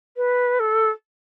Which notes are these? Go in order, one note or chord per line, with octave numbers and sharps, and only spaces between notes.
B4
A4